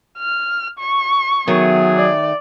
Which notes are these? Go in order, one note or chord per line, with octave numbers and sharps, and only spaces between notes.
F6
C#6
D#3 F#3 A3 B3 G#4
D5